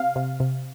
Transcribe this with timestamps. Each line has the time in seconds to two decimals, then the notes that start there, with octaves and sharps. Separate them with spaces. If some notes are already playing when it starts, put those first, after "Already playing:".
Already playing: C3 F5
0.16 C3
0.40 C3